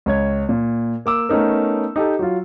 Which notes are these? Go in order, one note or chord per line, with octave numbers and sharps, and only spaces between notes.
C#2 C#5 G#6
A#2
A#3 D6 E6
A3 B3 C#4 D#4 A#4
D#4 G4 A4
F#3 F4